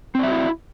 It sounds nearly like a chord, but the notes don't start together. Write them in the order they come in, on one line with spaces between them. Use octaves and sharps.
C4 D5 E5 F#4 E4